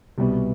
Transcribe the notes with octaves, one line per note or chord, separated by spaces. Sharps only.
C2 B2 G3 B3